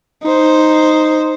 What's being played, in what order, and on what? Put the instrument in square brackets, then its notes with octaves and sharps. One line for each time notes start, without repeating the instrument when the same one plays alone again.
[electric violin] D#4 C5